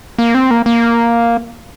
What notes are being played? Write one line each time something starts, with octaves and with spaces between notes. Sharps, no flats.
A#3
C4
A#3
A#3